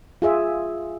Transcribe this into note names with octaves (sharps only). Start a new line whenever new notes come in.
F4 G#4 E5